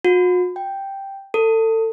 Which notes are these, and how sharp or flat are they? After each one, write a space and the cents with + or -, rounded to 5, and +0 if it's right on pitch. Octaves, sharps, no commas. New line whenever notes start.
F#4 -45
G5 +0
A4 +30